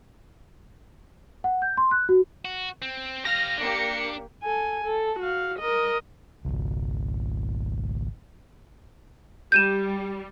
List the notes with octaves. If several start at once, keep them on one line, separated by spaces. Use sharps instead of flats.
F#5
G6
C6
F#6
F#4
F#4
C4
G4 F5 F6 A#6
A#3 D4 G4 C#7
A4 G#5
A4
F#4 F5
A#4 D#5
G#1 C#2
G3 G6 D#7 E7